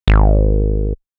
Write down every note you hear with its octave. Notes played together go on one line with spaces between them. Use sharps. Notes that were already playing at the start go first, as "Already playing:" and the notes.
G#1